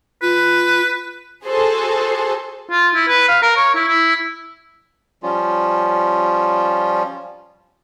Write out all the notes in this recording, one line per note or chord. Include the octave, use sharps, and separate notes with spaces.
F4 B4
F#4 G#4 A4 C5
F4
E4
B4
F5
A#4
C#5
E4
E4
F3 G3 C#4 F4